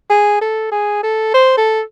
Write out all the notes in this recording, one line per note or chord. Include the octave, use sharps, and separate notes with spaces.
G#4
A4
G#4
A4
C5
A4